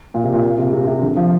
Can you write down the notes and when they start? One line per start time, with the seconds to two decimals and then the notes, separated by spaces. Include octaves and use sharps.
0.14 A#2
0.24 C3
0.33 A#2
0.43 A#2
0.58 C3
0.73 C3
0.87 C3
1.02 D3
1.16 F3